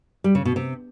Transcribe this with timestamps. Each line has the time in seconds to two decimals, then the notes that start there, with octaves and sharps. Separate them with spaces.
0.24 G3
0.35 C#3
0.45 B2
0.56 C3